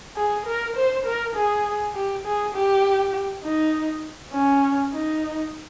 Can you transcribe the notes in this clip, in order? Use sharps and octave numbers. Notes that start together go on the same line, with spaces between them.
G#4
A#4
C5
A#4
G#4
G4
G#4
G4
D#4
C#4
D#4